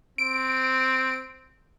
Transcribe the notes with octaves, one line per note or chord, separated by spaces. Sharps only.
C4 D7